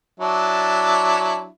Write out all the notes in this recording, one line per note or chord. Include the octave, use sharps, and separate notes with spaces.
F#3 D4 E4